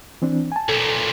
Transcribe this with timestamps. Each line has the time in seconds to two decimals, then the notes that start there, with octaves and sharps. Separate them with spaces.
0.22 E3 C4 D4
0.52 G#5 A5
0.69 B1 A#2 A4